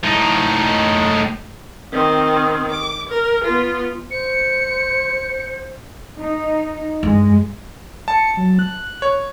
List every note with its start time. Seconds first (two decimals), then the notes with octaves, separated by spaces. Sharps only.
0.03 A2 D#4
1.93 D#3 C4
2.71 D6
3.09 A#4
3.44 B3 F4
4.10 C5 C#7
6.18 D#4
7.03 G2 G#3
8.08 A5 C#7
8.37 F#3
8.59 F#6
9.02 C#5